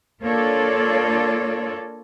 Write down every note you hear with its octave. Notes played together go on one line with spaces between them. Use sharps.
A#3 D4 F4 A4 C#5 D5